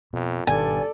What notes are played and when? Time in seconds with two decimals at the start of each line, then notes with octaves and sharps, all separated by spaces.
0.13 F2 B2
0.47 G#1 G2 B2 D#3 A4 D5 G#5